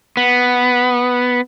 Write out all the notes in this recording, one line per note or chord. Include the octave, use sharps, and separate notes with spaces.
B3